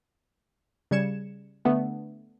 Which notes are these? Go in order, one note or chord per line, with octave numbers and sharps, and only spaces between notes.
C#3 G3 G#6 C#7 E7
D3 A3 B3 D4